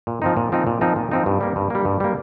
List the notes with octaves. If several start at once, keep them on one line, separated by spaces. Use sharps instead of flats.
A#2
F3 C4 D#4
A#2
F3 C4 D#4
A#2
F3 C4 D#4
A#2
F3 C4 D#4
G2
G3 A#3
G2
G3 A#3
G2
G3 A#3